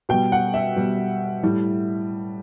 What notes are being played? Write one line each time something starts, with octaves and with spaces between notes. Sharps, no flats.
B2 G3 G5
F#5
E5
B2 G3
A2 G3